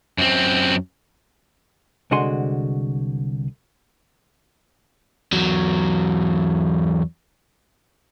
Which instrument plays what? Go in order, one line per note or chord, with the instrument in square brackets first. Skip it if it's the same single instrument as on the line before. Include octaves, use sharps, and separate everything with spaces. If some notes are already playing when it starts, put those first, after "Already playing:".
[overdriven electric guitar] F#2 C4
[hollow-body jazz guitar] C2 D3 G#3 F#4 G#5 C6
[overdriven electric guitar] E2 F#3